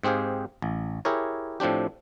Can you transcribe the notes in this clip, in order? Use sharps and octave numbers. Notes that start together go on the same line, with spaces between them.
G#2 C4 G4 G#4 F5
A1
E4 G4 G#4 A#4 C#5
A2 F3 C4 D4 G4